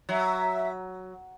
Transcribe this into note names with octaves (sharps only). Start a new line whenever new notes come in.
F#3 E5